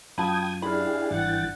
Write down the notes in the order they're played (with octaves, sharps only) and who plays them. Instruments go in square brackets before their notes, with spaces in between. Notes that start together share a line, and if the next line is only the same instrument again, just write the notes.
[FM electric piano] F#2 F4 [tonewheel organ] G5 D#6 G#6 [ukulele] A5 B5
[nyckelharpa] D4 F5 [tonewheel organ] E4 G4 G#4 [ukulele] B5
[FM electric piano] G#1 G2 [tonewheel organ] E3 G5 A6 [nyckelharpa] F#5